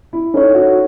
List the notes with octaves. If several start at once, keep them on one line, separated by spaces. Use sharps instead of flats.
E4
C#4 D#4 A4 C#5
F#4